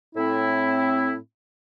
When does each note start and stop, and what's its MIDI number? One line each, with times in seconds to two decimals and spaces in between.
0.16 1.15 45
0.16 1.15 60
0.16 1.15 64